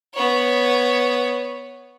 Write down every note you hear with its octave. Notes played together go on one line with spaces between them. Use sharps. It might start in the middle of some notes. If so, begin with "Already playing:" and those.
B3 C#5